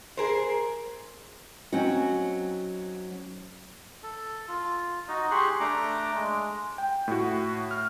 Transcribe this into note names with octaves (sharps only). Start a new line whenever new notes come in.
G#4 A#4 C5
F#3 C4 C#4 D#4 F#4
A4
F4
D#4 F#4 D#5
G4 G#4 C6 C#6 F#6
A3 D4 A#5 D6
G#3
G5
A2 F#4
F6